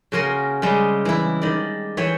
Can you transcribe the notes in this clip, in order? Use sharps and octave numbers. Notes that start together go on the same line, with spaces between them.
C#3 A#3 F#4 A#4 G#5 C6
C#3 G3 G#3 C4
E3 E4
D#3 D5
E3 C#5 E5 G5 G#5